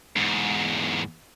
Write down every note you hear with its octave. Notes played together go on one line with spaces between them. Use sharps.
E2 G#2